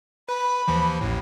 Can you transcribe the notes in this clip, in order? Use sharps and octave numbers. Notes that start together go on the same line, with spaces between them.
B4 B5
D#2 E3 F3
A1 D#2 A2